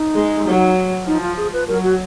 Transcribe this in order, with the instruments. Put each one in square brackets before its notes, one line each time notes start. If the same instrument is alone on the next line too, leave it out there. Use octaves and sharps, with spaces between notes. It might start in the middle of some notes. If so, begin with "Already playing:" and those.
Already playing: [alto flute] D#4
[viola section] G#3
F#3
[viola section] F3 [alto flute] D#4
[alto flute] F4
G#4
B4
[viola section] F#3 [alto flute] A#4
[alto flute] F#4